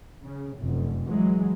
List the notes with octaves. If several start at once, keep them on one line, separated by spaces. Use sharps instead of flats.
C#3
F1 F#2
E3 F#3 G#3